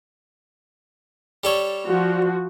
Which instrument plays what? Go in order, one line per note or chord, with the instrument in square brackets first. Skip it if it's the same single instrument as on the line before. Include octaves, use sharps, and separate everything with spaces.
[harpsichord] G3 A4 C#5
[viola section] F3 F#4